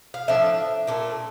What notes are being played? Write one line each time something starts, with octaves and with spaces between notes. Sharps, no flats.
F5
A2 F3 A3 D4 E5
A#2 A3 D4